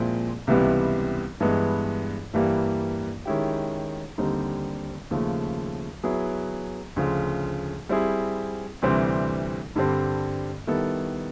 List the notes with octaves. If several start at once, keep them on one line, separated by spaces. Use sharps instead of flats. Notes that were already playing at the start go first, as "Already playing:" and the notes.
Already playing: A#2 F3 G#3 C4 E4
C#2 C3 E3 G3 B3
G2 E3 G#3 B3
G2 E3 G3 A#3
D#3 G#3 C#4 E4 G4
D#2 D3 G3 C4 D#4
D#2 C#3 F3 A3
F#3 B3 E4 G#4
D2 C#3 F3
G3 C4 E4 G#4
D2 C3 E3 G3 C4
G2 D3 G3 C4
D#3 G3 B3 E4 A4